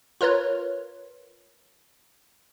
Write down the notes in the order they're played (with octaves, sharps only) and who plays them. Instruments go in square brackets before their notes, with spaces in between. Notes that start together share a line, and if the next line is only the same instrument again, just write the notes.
[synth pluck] F4 A#4 B4 C#5